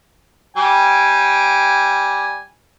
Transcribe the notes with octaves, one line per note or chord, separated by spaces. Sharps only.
G3 G5 G#5